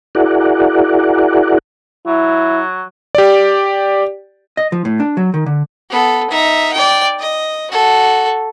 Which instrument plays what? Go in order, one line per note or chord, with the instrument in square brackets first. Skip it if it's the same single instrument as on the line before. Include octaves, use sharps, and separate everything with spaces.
[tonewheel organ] E4 F#4 G#4 A#4 D5 F#5
[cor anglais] F#3 [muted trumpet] E4
[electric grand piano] G4 D5
[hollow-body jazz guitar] D#5
F3
A2
D4
F#3
D#3
D3
[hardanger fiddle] B3 A4
D#4 E5
D5 G5
D#5
F#4 A4